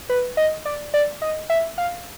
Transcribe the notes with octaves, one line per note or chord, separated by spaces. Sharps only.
B4
D#5
D5
D5
D#5
E5
F5